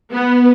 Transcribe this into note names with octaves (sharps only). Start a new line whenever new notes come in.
B3